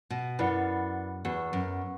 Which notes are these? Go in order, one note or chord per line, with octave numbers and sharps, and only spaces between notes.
B2
F#2 E4 B4 D5 F#5
E2 B3 F#4 B4 F#5
F#2